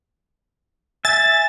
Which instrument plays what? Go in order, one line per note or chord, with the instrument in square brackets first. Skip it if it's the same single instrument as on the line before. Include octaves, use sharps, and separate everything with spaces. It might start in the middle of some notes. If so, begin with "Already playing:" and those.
[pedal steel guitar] E5 G#5 [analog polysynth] A6